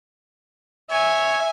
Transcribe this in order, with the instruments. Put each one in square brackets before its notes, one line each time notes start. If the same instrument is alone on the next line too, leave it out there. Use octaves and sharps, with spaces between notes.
[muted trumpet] C#5 [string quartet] E5 [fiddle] G#5